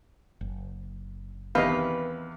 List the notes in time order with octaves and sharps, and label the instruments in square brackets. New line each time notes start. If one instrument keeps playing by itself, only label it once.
[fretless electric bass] F#1
[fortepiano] E2 C3 D#3 [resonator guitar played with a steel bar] B4 [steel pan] D#5 F5